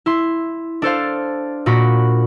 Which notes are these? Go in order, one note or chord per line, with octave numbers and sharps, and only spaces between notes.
E4 C6
D4 A4 C5 F5
A#2 A#3 F#4 B5